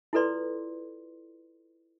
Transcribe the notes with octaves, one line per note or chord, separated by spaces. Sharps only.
E4 F4 A4 B4 D5 C6